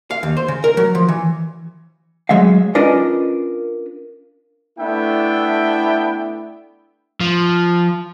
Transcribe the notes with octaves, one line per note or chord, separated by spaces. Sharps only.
F5
D#2
C5
C#3
A#4
F#3
F3
E3
F#3 G#3 E5 F5
C#4 D4 F4 A#4 B4 D#5
A3 B3 D4 E4 E5 G5
F3